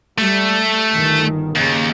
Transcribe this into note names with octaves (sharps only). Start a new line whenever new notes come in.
G3 A3
G1 D#3
D#2 C#3